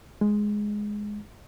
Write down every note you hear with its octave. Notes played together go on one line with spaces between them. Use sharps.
G#3